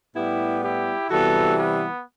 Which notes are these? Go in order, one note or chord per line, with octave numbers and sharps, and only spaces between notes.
A2 G3 B3 E4 G4
E4 G4
C3 E3 G3 B3 F#4 A4
B3